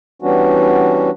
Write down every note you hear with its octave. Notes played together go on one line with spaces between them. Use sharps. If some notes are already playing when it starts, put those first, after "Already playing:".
E3 G3 B3 C#4 D4 F#4